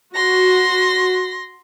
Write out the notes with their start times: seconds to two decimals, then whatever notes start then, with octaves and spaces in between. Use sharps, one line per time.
0.15 F#4 C6 A#6